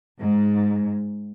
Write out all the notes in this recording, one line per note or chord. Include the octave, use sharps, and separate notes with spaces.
G#2